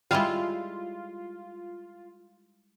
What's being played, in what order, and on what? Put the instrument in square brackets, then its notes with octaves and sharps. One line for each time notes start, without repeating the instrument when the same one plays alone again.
[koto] G3 G#3 E4 [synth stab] F4